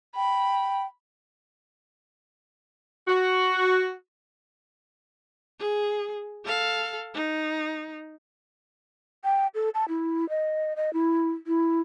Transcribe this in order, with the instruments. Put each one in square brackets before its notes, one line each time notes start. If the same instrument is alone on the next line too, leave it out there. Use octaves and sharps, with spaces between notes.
[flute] G5 [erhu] B5
[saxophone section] F#4
[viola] G#4
A4 F5
D#4
[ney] G5
A4
A5
E4
D#5
D#5
E4
E4